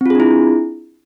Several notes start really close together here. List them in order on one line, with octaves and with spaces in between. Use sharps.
C4 F4 G#4 D4 E4